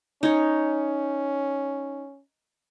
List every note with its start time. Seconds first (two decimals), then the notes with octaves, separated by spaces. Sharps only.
0.23 C#4 D#4 C#5